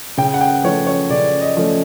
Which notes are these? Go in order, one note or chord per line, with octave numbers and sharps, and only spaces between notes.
C#3 G5
F#5
G5
F3 A3 C#4 C#5
C#5
C#3 D5
D#5
F3 A3 C#4